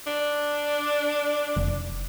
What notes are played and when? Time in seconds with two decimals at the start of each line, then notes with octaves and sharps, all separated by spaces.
0.07 D4
1.56 F1